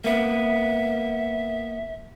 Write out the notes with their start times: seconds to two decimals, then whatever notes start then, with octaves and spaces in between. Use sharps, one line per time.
0.04 A#3 B3 E5